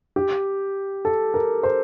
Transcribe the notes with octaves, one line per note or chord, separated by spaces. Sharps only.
G4
A4
A#4
C5